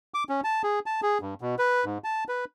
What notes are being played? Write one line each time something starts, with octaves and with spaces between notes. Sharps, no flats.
D6
C#4
A5
G#4
A5
G#4
G2
B2
B4
G#2
A5
B4